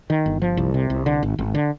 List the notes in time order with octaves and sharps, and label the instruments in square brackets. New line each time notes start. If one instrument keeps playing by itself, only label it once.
[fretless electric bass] D#3
G1
F3
C2
C3
C2
D3
G#1
G#1
D3